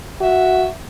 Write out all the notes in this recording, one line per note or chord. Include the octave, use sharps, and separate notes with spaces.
F#4 E5